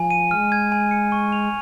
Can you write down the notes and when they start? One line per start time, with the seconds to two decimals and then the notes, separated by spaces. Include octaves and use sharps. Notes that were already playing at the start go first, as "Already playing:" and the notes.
Already playing: F3 G#5
0.11 D#7
0.31 G#3 F6
0.52 G#6
0.72 G#5
0.91 C#7
1.12 C#6
1.32 F7